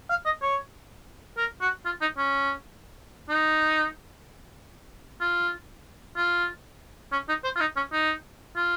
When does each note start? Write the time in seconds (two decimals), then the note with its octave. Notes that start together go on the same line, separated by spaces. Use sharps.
0.10 F5
0.25 D#5
0.42 C#5
1.37 A#4
1.61 F#4
1.86 F4
2.01 D#4
2.17 C#4
3.29 D#4
5.21 F4
6.17 F4
7.12 C#4
7.29 D#4
7.44 C5
7.56 F4
7.60 D#4
7.76 C#4
7.92 D#4
8.56 F4